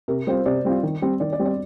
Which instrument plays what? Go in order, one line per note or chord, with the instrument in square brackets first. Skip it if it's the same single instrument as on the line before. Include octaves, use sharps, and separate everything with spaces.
[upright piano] C3 [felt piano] A#4
[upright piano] G3 C4 F4 [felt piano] C5
[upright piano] C3 [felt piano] D5
[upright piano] G3 C4 F4
D#3
G3 C4
[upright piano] D#3 [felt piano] D5
[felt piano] D5
[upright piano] G3 C4
[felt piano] D5